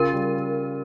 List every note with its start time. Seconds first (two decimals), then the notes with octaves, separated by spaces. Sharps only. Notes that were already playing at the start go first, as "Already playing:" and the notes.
Already playing: C#3 F4 A#4
0.13 G3